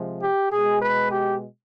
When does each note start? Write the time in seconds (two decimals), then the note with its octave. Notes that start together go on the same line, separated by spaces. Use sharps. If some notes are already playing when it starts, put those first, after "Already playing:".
Already playing: C3 F3 G#3
0.23 G4
0.52 B2 G#3 G#4
0.81 B4
1.11 G4